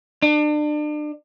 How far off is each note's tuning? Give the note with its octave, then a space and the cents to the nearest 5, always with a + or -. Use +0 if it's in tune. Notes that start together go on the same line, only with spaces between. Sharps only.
D4 +35